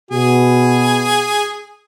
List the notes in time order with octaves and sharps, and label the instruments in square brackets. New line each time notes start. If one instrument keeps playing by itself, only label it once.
[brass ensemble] B2 F#4 [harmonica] G#4